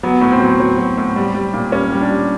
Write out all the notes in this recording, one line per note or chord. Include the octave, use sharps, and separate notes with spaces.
F#3 B3
A2
C4
F#3
F#3
F#3
A2
G3
G3
A#2
G3 C#4
G3
D4
G3